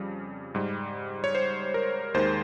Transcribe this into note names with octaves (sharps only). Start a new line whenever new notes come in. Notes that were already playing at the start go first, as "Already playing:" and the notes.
Already playing: F2 C#3 G3
G#2 G3
C#5
C5
A#4
D#2 D#3 G#3 C5